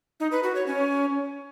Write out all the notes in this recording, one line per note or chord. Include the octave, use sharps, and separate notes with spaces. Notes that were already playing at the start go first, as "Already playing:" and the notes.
D#4
B4
F#4
C#5
C#4